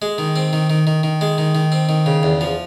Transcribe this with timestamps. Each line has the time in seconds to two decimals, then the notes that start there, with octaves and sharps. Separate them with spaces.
0.02 G#3
0.18 D#3
0.36 C4
0.53 D#3
0.70 D#3
0.87 D#3
1.03 D#3
1.21 G#3
1.38 D#3
1.55 D#3
1.72 C4
1.89 D#3
2.06 C#3
2.23 E2
2.41 F3